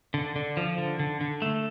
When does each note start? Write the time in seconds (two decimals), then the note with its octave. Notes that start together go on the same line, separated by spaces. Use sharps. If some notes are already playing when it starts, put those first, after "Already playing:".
0.14 D3
0.36 D3
0.57 F3
0.78 D3
0.99 D3
1.21 D3
1.42 A3